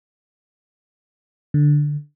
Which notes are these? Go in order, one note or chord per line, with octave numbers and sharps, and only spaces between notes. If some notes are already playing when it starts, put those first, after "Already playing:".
D3